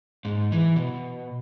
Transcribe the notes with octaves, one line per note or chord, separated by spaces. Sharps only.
G#2
E3
B2